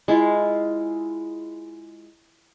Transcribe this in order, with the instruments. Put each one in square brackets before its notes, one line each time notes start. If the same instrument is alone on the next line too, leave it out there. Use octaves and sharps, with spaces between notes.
[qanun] G#3 E4 F4